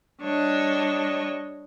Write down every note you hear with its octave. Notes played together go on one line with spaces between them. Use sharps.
G3 D4 C#5 D#5